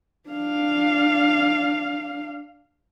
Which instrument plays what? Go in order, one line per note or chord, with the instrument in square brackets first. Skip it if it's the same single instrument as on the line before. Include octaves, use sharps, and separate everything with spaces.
[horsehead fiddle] D4 F5